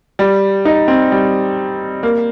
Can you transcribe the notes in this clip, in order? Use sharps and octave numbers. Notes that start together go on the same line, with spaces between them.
G3
D#4
C4
G3
A#3